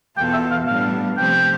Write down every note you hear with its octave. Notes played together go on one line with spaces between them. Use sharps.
E2 B2 B3 F4 A4 G5
E5
F5
A2 G3 B3 D4 F5
C3 F3 A3 C4 G4 G5